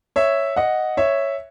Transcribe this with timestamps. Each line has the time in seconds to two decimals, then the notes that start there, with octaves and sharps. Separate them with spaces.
0.16 C#5 E5
0.56 D#5 F#5
0.97 C#5 E5